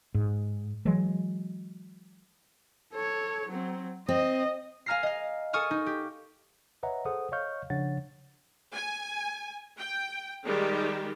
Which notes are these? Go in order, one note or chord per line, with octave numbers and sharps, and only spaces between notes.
G#2
E3 F#3 G#3
A4 C#5
F#3 C4
C4 D#5
F5 G#5 A#5 F6 A#6 C7
D#5 F5
A4 G#5 C#6 D#6 F6
D#4
G4
B4 C#5 D#5 E5 F#5 A#5
G#4 A4 C5 F#5 D#6
C#5 D#5 F5 C#6 F6 G6
C#3 F3 D4 C#5 F#5 A6
G#5
G5
D#3 G3 G#3 G4